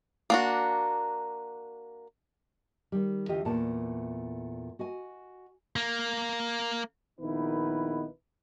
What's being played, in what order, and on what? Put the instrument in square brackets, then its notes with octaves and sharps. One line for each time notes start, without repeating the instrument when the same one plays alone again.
[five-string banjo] A#3 D4 F#4
[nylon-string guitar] D#3 G3
D2 E3 F4 G4 D#5
E2 A#2 A3 D5 A5
F#4 D#5 G#5
[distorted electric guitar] A#3
[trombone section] A#1 D#3 B3 D#4 E4 B4